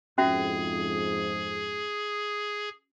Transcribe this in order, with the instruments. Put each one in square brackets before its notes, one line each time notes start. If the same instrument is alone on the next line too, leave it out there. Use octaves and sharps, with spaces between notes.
[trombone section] F2 G#2 [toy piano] C#4 F#4 E5 [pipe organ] G#4